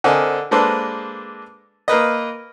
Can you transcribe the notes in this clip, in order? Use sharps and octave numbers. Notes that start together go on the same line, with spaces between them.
D3 C4 A#4 D#5 G#5
G#3 A#3 D4 A4 B4 C5
A#3 A#4 B4 D#5